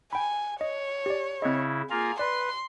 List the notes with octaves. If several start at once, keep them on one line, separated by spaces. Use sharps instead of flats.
G5 G#5 B5
C#5 D#5
G4 D5
C#3 C4 E4 D#5
A#3 F4 G#4 A#5
B4 D5 C6